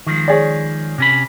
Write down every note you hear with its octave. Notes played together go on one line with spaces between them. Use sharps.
D#3 F3 G#3
G#4 C#5 D5
C3 C#4 B5